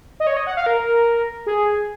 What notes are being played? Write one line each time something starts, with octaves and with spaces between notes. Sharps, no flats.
D#5
C#5
D#5
F#5
F5
A#4
G#4